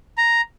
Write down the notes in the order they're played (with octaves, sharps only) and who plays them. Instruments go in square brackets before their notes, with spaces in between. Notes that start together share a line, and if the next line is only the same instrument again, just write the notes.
[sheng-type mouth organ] A#5